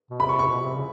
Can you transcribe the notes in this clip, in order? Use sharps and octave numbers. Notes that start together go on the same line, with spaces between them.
B2
C3 B5
C#6
C#6
B2
C3
C#3